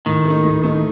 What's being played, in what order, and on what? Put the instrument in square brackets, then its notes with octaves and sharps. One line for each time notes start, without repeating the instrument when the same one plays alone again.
[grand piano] A2 [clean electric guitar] D#3
[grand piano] A3
D#4
A2
A3 D#4